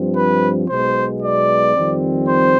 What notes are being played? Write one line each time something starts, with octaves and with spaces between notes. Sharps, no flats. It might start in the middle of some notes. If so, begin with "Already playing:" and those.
Already playing: G2 F3 C4
B4
B1 B2 G#3 B3 C5
D5
F2 D#3 G3 C4
C5